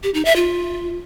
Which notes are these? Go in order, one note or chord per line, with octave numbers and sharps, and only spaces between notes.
G4
D#4
E5
F4